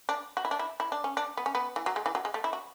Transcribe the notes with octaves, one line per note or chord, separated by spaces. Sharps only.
D4
F#4
E4
D4
E4
E4
D4
C#4
D4
B3
C#4
B3
E3
F#3
G#3
E3
F#3
G#3
A3
E4
F#4